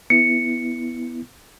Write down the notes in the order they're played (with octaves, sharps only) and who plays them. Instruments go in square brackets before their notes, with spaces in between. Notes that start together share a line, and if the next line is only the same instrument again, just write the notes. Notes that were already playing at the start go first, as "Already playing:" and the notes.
[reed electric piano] B3 E4 [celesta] C#7